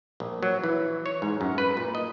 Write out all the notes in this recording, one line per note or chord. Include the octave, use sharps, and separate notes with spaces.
A#1
F#3
E3
C#5
G#2
F#2
B4
A#2
D#5